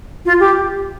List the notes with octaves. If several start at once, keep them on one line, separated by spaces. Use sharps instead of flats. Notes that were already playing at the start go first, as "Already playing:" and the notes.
F4
G4